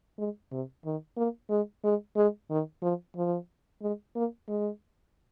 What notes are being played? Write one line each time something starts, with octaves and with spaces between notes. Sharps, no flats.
G#3
C3
D#3
A#3
G#3
G#3
G#3
D#3
F3
F3
G#3
A#3
G#3